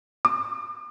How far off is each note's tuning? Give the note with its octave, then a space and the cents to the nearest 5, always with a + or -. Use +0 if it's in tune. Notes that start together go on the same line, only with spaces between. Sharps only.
D6 +45